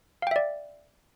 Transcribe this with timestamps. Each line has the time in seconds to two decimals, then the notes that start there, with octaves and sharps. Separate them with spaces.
0.22 F5
0.27 G5
0.31 E5
0.36 D5